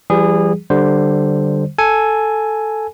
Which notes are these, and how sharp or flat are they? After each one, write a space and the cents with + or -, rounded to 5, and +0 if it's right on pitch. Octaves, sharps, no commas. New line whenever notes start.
E3 +45 G3 +0 G#4 -20
D3 +10 G3 -10 C5 +0
A4 +0 G#5 +5